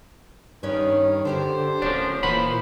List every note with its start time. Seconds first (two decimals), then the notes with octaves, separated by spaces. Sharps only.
0.63 G2 D#3 C#4 B4 C#5
1.25 D3 E4 G4 A4 C5
1.82 D1 F3 F#3 A#3 C#4 D4
2.23 A#2 E3 F3 A#4 C5 F#5 B5